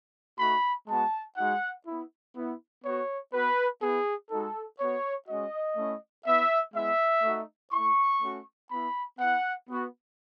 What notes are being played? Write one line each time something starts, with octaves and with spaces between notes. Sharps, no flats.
A3 D#4 F#4 B5
G#3 B3 F#4 A5
G#3 D#4 F#4 F#5
B3 E4
B3 E4
B3 F#4 C#5
B3 F#4 B4
B3 G#4
E4
G#3 D#4 F#4 A4
B3 F#4 C#5
G#3 C#4 F#4 D#5
A3 C#4 E4
B3 E4 E5
G#3 B3 E4 E5
A3 D#4 F#4
A3 E4 C#6
A3 C#4 F#4
B3 E4 B5
B3 E4 F#5
B3 F#4